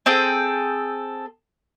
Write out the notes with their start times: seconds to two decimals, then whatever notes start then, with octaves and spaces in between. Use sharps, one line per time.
0.06 C4 G#4 A4 G5